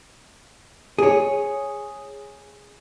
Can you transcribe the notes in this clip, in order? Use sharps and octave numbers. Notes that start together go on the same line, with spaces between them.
G#4 C#5